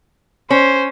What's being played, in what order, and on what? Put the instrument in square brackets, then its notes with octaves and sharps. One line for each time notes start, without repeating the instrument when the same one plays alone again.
[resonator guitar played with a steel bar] C#4 [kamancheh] C5